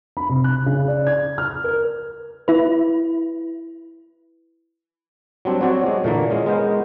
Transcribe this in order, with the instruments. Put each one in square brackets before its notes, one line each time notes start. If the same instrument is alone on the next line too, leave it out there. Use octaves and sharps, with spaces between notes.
[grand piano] B5
C3
F#6
C#3
D5
G#6
F6
A#4
[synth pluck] E4 B4
[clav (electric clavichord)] F#3 G3 C4 D4
F#3 C4 F#4 C#5 D5
G#3
A#2 D3 E3 A#3
G#3 C#4
G#3 B3 A#4 C5